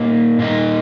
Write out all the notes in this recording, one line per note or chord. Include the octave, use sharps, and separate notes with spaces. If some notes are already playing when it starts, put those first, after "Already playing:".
Already playing: A#2 A#3 D#4
A#2 A#3 D#4